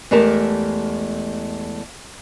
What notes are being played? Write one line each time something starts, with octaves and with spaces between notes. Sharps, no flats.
E2 G#3 A3 G4 A#4 A5